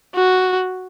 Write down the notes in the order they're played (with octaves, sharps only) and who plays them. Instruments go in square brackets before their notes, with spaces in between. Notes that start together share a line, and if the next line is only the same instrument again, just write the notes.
[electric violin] F#4